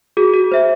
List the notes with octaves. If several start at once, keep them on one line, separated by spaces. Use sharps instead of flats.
F#4 G#4
F#4
C5 E5